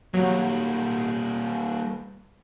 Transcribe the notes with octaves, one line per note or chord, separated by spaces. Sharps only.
F#3 G3 A#3